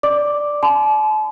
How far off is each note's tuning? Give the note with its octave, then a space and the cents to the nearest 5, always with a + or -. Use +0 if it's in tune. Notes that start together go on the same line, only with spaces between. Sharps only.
D5 +0 D6 +0
A5 -40 C6 -45